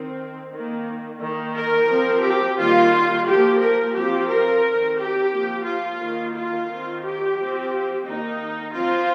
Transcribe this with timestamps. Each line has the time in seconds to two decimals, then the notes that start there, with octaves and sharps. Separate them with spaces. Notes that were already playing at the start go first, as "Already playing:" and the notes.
Already playing: D#3 C4
0.53 D#3 A#3
1.21 D#3 A#3
1.55 A#4
1.89 F3 C4
2.24 G4
2.58 D#3 G3 A#3 F4
3.26 F3 A#3 G4
3.60 A#4
3.94 F3 C4 G4
4.30 A#4
4.63 D#3 C4
4.97 G4
5.32 F3 A#3
5.65 F4
6.01 D#3 A#3
6.34 F4
6.68 D#3 C4
7.03 G4
7.38 F3 C4
8.05 D#3 A#3 D#4
8.74 F3 C4 F4